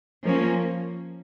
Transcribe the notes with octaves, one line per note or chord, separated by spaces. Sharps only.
F3 A#3 C#4